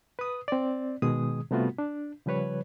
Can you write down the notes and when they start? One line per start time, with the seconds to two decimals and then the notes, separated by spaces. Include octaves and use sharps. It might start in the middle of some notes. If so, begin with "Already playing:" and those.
0.19 B4 D#6
0.48 C4 D5
1.02 B2 D#3 G#3 G#4 D#6
1.51 C3 G3 A3 B3 F4 F#4
1.78 D4
2.26 C#3 F3 G3 B4 C#5